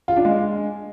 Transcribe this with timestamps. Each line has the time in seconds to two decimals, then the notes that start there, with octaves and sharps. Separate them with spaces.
0.08 F4
0.16 D4
0.25 G#3